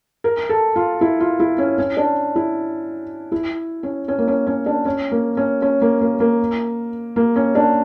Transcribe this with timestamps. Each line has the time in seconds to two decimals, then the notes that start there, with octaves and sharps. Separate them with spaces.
0.24 A#4
0.49 A4
0.76 F4
1.01 E4
1.20 F4
1.40 E4
1.58 C#4
1.78 C#4
1.97 D4
2.35 E4
3.32 E4
3.83 C#4
4.08 C#4
4.18 A#3
4.28 C#4
4.47 C#4
4.66 D4
4.85 C#4
5.11 A#3
5.37 C#4
5.62 C#4
5.81 A#3
6.01 A#3
6.20 A#3
7.16 A#3
7.36 C#4
7.55 D4